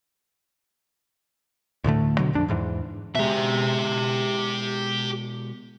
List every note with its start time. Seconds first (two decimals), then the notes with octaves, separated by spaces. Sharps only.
1.84 D2 A2 D3 A3
2.18 B2 D3 F#3
2.33 A#1 F2 D4
2.48 E2 G#2 E3
3.15 B2 G#3 G4 E5